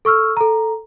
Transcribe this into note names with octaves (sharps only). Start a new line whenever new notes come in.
A4 C#6 E6 F6
A4 A#5